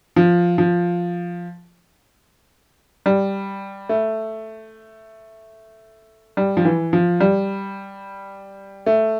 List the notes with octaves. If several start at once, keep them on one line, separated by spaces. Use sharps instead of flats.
F3
F3
G3
A3
G3
F3
E3
F3
G3
A3